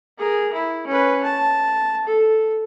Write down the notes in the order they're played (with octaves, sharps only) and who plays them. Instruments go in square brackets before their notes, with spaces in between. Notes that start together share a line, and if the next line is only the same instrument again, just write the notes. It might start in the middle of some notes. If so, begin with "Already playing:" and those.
[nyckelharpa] G#4 A#4
E4
C#4 B4
A5
A4